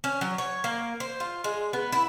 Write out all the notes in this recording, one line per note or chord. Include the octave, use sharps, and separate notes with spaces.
C#4
F#3
C#5
A#3
C5
F4
G#3
B3
E4